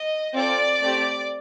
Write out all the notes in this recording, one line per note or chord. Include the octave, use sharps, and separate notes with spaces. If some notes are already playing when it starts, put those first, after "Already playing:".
Already playing: D#5
C4 F4 A4 D5
A3 C4 G4